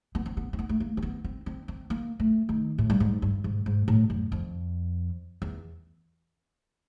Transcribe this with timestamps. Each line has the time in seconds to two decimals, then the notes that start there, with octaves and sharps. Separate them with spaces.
0.15 B3
0.26 C4
0.37 B3
0.53 C4
0.59 B3
0.69 A3
0.80 A#3
0.97 C4
1.02 B3
1.24 C4
1.46 C4
1.68 C4
1.90 A#3
2.20 A3
2.49 D#3
2.78 A2
2.90 G2
3.00 G#2
3.22 G2
3.44 G#2
3.66 G#2
3.88 A2
4.10 F#2
4.32 F2
5.42 E2